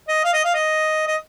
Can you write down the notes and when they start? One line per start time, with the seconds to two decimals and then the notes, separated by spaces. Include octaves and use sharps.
0.08 D#5
0.24 F5
0.34 D#5
0.44 F5
0.54 D#5
1.07 D#5